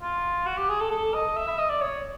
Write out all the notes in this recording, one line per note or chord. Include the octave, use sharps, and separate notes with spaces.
F4
F#4
G4
G#4
A4
A4
D#5
E5
E5
D#5
D5
C#5